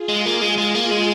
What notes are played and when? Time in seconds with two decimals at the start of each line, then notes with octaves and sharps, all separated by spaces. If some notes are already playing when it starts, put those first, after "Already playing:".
Already playing: F4 G#4
0.09 G#3
0.26 A#3
0.41 G#3
0.58 G#3
0.75 A#3
0.91 G#3